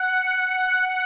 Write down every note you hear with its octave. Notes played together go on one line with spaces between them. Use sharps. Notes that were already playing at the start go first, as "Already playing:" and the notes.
Already playing: F#5
F#5